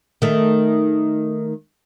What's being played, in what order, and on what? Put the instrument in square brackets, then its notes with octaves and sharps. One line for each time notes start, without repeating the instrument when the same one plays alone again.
[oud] D#3 A3